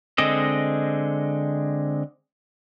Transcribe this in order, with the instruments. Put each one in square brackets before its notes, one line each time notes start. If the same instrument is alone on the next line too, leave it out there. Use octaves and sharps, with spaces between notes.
[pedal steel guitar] D3 G#3 C4 D#5